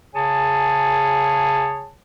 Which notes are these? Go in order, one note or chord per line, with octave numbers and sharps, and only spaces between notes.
C#3 G#4 C#5 G#5 A5